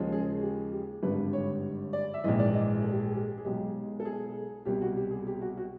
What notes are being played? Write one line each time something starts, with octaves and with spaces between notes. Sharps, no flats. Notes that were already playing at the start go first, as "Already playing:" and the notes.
Already playing: D#2 C#3 F3 G#3
G#4
G4
G4
G#1 G2 D3 G3 B4
C#5
D5
E5
A#1 G#2 E3 D#5
D5
D#5
G#4
A4
G4
G#4
G#4
G4
G#4
B1 B2 G#3 G4
A4
G#4
C2 B2 G3 G4
F#4
G4
G#4
G4
F#4
F#4